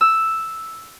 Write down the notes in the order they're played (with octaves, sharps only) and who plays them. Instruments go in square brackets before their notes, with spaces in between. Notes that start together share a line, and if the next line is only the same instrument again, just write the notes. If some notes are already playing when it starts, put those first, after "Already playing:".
[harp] E6